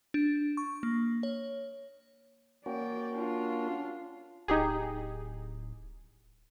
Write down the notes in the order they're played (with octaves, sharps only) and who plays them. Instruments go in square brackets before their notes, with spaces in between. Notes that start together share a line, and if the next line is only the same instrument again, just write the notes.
[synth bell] D4
C#6
A#3
C#5
[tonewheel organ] A#3 C#4 F#4 [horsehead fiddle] D5 G5
[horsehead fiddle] D4 F4
[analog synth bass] D1 [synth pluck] D#4 G4 G#4